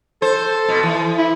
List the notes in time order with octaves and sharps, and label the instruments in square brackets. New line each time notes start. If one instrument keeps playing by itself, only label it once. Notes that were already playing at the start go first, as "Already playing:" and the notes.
[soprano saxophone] A4 [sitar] C5
[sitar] B2
E3
[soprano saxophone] E4